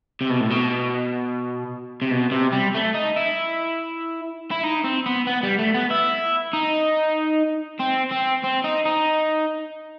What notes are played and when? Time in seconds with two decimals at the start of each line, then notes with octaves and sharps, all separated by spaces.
0.21 C3
0.30 B2
0.40 A2
0.50 B2
2.02 C3
2.11 B2
2.31 C3
2.52 G3
2.75 A3
2.94 D#4
3.16 E4
4.51 E4
4.64 D#4
4.84 C4
5.06 B3
5.27 B3
5.43 G3
5.59 A3
5.74 B3
5.91 E4
6.53 D#4
7.80 C4
8.11 C4
8.44 C4
8.64 D#4
8.86 D#4